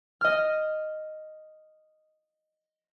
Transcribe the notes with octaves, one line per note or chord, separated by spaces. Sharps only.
D#5 F6